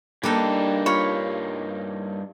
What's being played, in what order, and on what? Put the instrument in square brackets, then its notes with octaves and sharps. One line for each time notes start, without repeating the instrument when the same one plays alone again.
[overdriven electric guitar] G2 D#4 [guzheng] G3 D4 [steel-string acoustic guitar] A#3 [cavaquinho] A4 B4
[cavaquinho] F4 C#5 B5